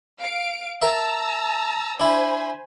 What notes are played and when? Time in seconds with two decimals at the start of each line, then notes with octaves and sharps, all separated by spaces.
0.20 F5 D7
0.82 A#4 E5 A5 A#5 E6
2.00 D4 E4 C5 G#5 B5